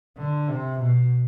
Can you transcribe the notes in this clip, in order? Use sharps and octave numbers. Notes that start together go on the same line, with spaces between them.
D3
C3
B2